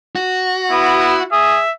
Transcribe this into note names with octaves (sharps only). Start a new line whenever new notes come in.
F#4
B3 E4
G#4 E5